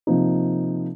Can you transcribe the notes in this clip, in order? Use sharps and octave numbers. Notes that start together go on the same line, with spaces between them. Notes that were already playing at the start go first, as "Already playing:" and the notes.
C3 F3 A#3 D#4